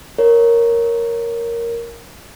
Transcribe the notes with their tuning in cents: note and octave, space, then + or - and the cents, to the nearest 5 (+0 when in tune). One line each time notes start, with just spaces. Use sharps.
A#4 +0 C#5 +0